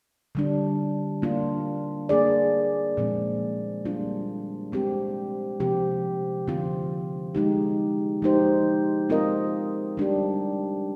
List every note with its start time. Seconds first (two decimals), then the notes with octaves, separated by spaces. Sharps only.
0.35 D3 G3 D4
1.22 A#3 D4 F4
2.09 A#3 D4 G#4 D5
2.97 A#2 F3 G#3 C4
3.85 G3 A#3 D4 F4
4.72 G#3 C4 G4
5.60 C3 F3 C4 G4
6.48 D3 F3 C4 F4
7.35 G#3 D#4 G4
8.22 F3 G#3 D#4 G4 C5
9.09 G#3 C4 F4 A#4 D#5
9.97 G3 D4 G4